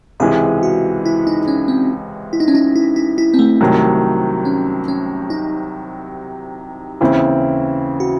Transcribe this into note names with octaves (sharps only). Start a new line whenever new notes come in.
C#2 C3 E3 G#3 G#4
F#4
E4
D#4
C#4
C4
E4
D#4
C#4
D#4
E4
E4
E4
C4
A3
C2 C3 D#3 F#3
C#4
C#4
D#4
D#2 C#3 E3 C4 E4
F#4